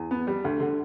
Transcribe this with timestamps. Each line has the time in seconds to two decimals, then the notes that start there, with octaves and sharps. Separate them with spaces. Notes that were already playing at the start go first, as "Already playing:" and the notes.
Already playing: E2
0.11 B3
0.27 G3
0.44 D2
0.60 D3